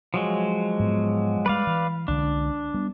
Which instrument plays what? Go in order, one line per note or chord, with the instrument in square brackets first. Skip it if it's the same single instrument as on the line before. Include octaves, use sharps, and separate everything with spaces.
[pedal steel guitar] F3 F#3 G#3
[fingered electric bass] G#2 B3
[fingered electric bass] G3 G#3 [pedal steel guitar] B4 D5 F5
[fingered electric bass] E3
[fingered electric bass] C2 D3 G#3 [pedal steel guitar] D4
[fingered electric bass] G3 B3